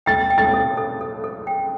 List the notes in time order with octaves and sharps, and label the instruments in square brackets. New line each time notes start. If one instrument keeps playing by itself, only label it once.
[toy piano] G5 [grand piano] A6
[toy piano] G5
[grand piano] A6
[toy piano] A4
A4
A4
A4
G5